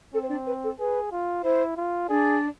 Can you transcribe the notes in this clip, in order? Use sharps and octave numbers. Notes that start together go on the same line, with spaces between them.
C4 A4
C5
D4 D5
B4
A4
G#4 B4
F4
E4 C5
F4
D4 G#4 D5